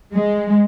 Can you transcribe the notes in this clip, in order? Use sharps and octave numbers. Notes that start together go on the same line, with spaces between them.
G#3